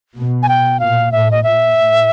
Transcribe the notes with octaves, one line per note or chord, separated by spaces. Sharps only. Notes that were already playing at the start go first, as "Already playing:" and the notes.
B2
G#5
G5
A#2 F5
A2 E5
D#5
A#2 E5
A2